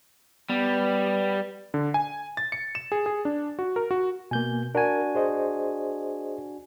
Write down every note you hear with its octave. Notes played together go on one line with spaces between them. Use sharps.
G3 B3
D3
G#5
A6
C#7
E7
G#4
G#4
D4
F#4
A#4
F#4
B2 A#3 G#5 G6
D4 F#4 A#4 G#5
G#4 C5 D#5